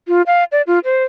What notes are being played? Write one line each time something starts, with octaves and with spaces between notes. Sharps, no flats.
F4
F5
D5
F4
C5